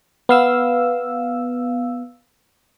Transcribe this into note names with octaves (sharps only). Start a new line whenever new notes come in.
B3 F5 E6